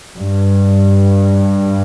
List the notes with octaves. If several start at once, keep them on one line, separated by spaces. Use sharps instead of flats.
G2